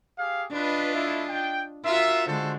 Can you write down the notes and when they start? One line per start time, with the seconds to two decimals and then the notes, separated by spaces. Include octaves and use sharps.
0.18 G4 G#4 F5
0.52 D4 F4 B4 D#5
0.94 A3 E4
1.30 G5
1.85 F4 F#4 A#4 E5
2.27 D3 G#3 F#4 A4 C5